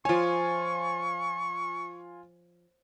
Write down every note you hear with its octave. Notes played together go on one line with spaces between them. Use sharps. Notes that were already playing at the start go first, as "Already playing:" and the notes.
F3 F4 C#5 G#5 C#6